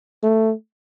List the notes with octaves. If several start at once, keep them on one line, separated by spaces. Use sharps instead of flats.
A3